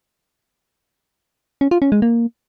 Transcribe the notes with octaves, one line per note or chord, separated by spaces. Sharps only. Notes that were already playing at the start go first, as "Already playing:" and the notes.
C#4
F4
C#4
G#3
A#3